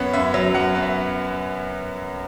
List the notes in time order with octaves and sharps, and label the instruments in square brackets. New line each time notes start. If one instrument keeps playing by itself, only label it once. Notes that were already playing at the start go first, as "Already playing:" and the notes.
Already playing: [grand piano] F#2 B3 C#5
F#2 E5
F#3
F#2 F#5
B3
E5